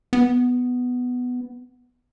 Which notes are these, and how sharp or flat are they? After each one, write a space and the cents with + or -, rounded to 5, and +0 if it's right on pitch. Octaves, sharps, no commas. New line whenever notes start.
B3 +5